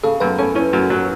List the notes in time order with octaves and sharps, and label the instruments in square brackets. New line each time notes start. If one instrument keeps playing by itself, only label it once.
[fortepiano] C#3 [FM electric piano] A4
[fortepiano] F#2 [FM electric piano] B4
[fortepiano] C#4 [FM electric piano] A4
[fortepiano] C#4 [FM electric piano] E4
[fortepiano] F#2 [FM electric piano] F#4
[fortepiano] F#3